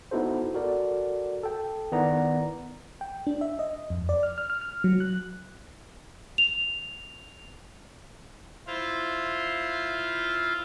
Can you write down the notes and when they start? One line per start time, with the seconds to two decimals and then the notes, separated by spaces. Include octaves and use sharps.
0.11 B3 D#4 E4 F#4 A4 C5
0.54 F#4 A4 A#4 D5
1.43 A4 G5
1.92 D#3 B3 E4 D5 A#5
3.01 G5
3.27 D4
3.41 E5
3.59 D#5
3.90 F2
4.09 D5
4.23 F6
4.38 F6
4.50 F6
4.61 F6
4.84 F#3
5.00 F#6
6.38 F7
8.67 E4 F4 C5 F5